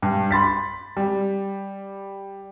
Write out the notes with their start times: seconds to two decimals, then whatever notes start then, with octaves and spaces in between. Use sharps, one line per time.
0.02 G2
0.31 B5 C6 A6 B6
0.97 G3